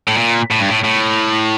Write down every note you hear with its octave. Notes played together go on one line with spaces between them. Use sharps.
A2
A#2
A2
G2
A2
A2